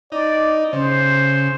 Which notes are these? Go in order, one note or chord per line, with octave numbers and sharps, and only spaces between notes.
D#4 D5
C#3 C5